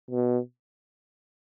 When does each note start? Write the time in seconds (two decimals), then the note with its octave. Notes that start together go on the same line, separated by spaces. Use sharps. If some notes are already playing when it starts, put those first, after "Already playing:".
0.11 B2